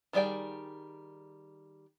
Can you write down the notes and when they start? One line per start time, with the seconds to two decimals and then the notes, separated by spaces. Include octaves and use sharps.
0.13 D#3 G3 G#4 D5 G5